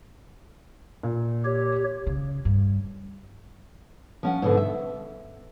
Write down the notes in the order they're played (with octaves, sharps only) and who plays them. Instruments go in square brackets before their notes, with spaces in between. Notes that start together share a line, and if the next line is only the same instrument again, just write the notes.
[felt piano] A#2
[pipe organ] G4 C#5
[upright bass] C#3
G2
[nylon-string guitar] F3 C#4 F#5
G#2 B2 D3
E5